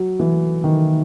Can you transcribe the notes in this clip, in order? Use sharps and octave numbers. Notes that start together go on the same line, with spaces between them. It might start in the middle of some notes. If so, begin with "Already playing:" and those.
Already playing: F#3
E3
D#3